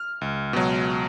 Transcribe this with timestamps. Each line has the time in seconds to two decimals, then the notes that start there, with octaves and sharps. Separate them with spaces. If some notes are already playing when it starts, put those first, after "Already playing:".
Already playing: F6
0.21 C#2
0.53 B2 F#3